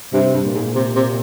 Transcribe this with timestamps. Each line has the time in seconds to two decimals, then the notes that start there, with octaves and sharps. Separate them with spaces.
0.13 G2 C3
0.34 G2
0.44 A#2
0.55 G#2
0.75 C3
0.96 C3